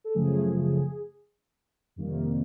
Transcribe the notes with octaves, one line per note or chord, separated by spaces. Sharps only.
A4
F#2 C#3 F3 A3 G#4
F2 C3 D#3 G3 A#3